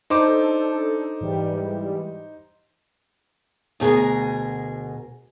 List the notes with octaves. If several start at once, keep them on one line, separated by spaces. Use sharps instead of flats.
D4 D#4 A4 C5 D6
G#2 E3 G3
D2 B2 G#4 A#4